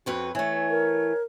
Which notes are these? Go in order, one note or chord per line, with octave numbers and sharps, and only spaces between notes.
F2 F#4 B4 C#5
E3 A3 C#5
A#4